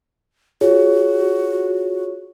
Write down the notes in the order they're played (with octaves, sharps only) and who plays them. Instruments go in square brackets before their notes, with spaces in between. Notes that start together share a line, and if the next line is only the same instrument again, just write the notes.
[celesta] F4 C#5 [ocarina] F#4 [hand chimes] G#4